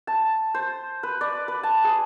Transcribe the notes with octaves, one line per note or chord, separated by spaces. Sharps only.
A5
C5
B4
D5
B4
A5
G#4